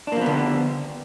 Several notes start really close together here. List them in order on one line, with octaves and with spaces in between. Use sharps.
D4 A#3 F3 B3 D3